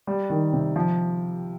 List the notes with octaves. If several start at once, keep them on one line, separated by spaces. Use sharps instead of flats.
G3
D#3
C3
F3